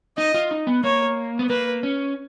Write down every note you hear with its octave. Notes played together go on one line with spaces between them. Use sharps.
D#4 D#5
F4
D#4
B3
A#3 C#5
B3
A#3 B4
C#4